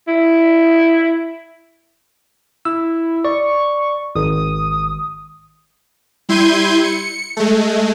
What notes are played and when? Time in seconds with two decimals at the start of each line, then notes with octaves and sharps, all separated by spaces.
0.08 E4
2.65 E4 E6
3.25 D5 C#6
4.15 G#1 D#6
6.29 G3 E4 C6 G6 G#6 D#7
6.84 C#7
7.37 G#3 A3